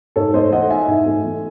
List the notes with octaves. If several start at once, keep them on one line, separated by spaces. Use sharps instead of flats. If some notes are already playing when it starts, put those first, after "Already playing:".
G#2 A4 C#5
A3 C5 D#5
E3 D#5 F#5
D#4 E5 G#5
G#2
A3
E3